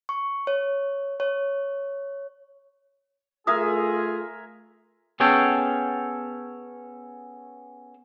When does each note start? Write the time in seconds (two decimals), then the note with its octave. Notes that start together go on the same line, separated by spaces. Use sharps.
0.09 C#6
0.47 C#5
1.20 C#5
3.47 A3 F4 G#4 A#4 E5 G#5 D#6
5.20 B3 C#4 G#4 A4 G5